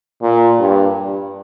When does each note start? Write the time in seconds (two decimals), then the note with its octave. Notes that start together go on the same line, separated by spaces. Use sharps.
0.22 A#2
0.59 G2